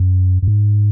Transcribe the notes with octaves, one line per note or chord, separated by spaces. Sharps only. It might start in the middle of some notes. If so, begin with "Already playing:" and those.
Already playing: F#2
F#2
G#2